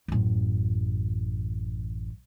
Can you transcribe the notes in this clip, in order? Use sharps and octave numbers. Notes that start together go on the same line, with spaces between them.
A1 F#2